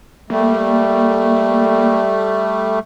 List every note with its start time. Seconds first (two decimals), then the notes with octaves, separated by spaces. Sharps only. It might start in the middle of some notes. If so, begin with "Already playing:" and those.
0.30 G3 A3 A#3